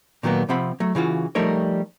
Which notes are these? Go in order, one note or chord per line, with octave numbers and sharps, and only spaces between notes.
A#2 D#3 F#3 A#3 B3
C3 F3 C4 F#5 B5
F#3 A3
C#3 E3 F4 F#4
F3 G3 A3 D#4 A#4 C#5